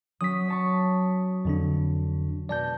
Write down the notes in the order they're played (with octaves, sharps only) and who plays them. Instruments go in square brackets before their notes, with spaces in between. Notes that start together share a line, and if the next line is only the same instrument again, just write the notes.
[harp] F#3 C#4 [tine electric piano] D#6 B6
[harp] C#5 A5 C#6
[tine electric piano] F2 D3 D4
[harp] B2 G#3 [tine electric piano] D5 A5 G6